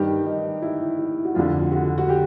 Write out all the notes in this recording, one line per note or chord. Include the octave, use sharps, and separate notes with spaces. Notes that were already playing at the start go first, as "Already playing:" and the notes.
Already playing: G2 D#3 G4
D#4
E4
E4
F#4
F2 D3 F4
F#4
F#4
G4